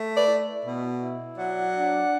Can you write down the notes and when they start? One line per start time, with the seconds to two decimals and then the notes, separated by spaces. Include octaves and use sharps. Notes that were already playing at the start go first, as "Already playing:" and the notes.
Already playing: A3
0.14 B4 D5
0.27 E4
0.64 B2
1.01 E4
1.37 F#3 D5 F#5
1.74 D4